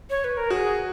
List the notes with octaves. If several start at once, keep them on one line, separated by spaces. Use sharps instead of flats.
C#5
B4
A#4
F#4 G#4